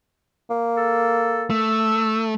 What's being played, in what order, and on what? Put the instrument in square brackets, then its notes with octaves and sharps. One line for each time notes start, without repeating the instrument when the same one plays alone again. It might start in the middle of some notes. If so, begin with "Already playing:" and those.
[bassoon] A#3
[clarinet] A4
[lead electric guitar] A3 [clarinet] E6